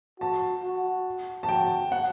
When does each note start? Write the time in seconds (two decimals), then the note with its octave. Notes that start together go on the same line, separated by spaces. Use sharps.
0.20 F#4 A5
0.63 F#4
1.43 A5
1.49 F#4 G5
1.92 F#5